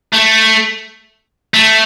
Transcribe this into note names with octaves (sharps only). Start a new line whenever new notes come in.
A3
A3